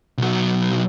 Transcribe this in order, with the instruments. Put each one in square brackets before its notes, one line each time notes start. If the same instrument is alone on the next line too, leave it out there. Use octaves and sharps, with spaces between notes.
[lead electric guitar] B1 F#3